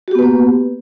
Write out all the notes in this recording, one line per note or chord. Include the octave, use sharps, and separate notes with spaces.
A#3 B3 F#4 G4 B4